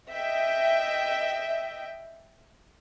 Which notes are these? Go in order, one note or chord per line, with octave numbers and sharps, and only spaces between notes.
D#5 E5 G5